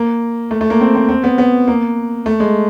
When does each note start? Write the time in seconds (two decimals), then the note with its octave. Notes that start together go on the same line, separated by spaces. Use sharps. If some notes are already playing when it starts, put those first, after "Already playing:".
Already playing: A#3
0.51 A3
0.61 A3
0.70 A#3
0.81 C4
0.95 C4
1.09 C4
1.24 B3
1.38 B3
1.68 A#3
2.26 A3
2.40 G#3